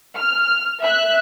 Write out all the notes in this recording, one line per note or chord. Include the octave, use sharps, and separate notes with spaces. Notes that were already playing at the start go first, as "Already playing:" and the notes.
F6
E5 F#6